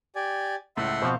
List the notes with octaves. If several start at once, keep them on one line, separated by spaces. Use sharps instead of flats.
G4 D5 G#5
C#2 A2 E5 F#5 C6
B2 F3 C4 C5 F5 C#6